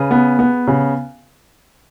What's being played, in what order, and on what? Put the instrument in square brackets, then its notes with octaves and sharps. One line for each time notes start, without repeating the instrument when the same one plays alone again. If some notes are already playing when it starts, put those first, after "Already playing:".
Already playing: [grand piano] C#3 [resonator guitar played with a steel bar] G#4 B4
[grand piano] B3
B3
C#3